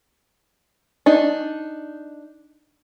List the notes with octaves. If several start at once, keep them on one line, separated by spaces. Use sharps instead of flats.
D4 D#4